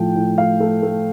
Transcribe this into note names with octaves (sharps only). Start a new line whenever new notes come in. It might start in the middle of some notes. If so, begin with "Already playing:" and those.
Already playing: A2 F3 A3 G5
A2
A3 F5
A3
A3